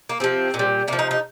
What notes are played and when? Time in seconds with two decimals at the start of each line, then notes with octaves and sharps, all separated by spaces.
0.09 A#3
0.20 C3 F3 C4
0.54 A#2
0.59 G3
0.88 C3 A#3
0.93 F3
0.99 D#4
1.11 D#4